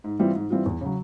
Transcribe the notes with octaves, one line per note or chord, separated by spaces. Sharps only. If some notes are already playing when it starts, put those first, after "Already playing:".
G#2
E3 G3 C4 F4
G#2
E3 G3 C4 F4
E2
C#3 F#3